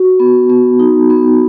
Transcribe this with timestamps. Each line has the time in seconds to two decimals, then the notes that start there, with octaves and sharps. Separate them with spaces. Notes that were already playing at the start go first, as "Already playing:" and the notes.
Already playing: F#4
0.20 B3
0.49 B3
0.79 D#4
1.10 B3